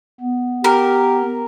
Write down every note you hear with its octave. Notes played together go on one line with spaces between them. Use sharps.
B3
G4 A#4